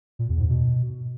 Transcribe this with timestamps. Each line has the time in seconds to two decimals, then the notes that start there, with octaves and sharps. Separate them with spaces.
0.19 A#2
0.29 E2
0.39 G#2
0.49 B2